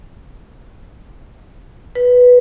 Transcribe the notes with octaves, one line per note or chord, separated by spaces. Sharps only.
B4